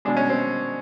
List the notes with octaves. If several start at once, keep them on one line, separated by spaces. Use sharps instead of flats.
B2 G#3 D4
C#4
C4